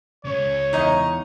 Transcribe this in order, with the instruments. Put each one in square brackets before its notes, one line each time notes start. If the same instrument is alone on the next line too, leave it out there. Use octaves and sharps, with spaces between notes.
[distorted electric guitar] C#3 G#3 [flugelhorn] C#5
[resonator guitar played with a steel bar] E2 D#5 [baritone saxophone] D#4